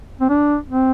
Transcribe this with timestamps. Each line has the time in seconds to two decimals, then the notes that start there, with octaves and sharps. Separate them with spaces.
0.21 C4
0.30 D4
0.70 C4